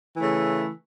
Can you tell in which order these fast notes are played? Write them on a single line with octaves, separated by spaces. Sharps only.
E3 A3 C#3